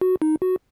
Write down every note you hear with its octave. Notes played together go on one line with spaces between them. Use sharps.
F#4
D#4
F#4